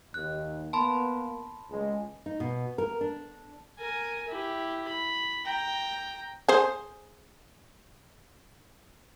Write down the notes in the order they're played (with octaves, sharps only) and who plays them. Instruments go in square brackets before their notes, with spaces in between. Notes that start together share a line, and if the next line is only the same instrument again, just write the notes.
[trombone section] D#2 [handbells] F#6
[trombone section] A#3 B3 [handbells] A5 B5 C6
[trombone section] C#2 G#3
[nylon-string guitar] D#4
B2
A#4
D4
[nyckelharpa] A#4 G#5
E4 G4
B5
G5 A#5
[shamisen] G#4 C5